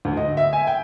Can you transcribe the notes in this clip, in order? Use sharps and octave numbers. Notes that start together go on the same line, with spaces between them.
D2
D#5
E5
G#5
G5